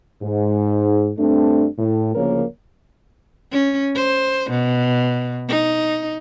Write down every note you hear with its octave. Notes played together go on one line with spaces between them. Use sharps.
G#2
G2 A3 C4 D4
A2
D2 C#3 F3 A#3 A#4 C#5
C#4
C5
B2
D#4